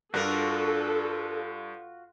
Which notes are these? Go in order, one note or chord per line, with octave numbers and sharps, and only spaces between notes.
G2 D4 F4 F#4 A4 A#4 D5